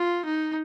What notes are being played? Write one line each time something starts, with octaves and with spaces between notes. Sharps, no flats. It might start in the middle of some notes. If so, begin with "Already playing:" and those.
Already playing: F4
D#4